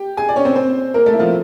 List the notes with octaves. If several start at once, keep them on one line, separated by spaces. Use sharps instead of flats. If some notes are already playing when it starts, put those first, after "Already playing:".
Already playing: G4 G5
G#4 G#5
D5
C#4 C#5
C4 C5
C4 C5
A#3 A#4
A3 A4
E4
F3 F4